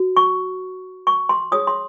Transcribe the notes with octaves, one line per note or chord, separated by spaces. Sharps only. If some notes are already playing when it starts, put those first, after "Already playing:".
Already playing: F#4
C#6
C#6
C6
D#4 G#4 C#5 D#6
C6